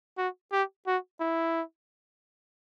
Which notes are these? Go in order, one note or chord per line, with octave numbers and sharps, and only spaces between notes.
F#4
G4
F#4
E4